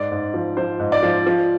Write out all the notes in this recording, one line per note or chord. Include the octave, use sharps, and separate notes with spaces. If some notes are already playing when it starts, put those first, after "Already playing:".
Already playing: G#2 D5
G#2
F3
F3 C5
G#2
D5
F3
F3